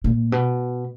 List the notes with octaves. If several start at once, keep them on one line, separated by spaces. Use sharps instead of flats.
A#2
B2